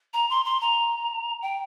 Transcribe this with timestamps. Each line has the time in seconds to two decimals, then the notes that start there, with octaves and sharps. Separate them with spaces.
0.14 A#5
0.30 C6
0.45 C6
0.61 A#5
1.42 G5